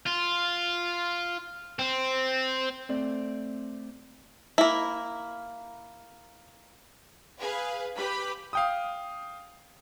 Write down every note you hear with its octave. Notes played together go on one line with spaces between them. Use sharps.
F4
C4
A3 C4 D5
A#3 E4
G#4 B4 F5
G4 B4 B5
F5 G5 D#6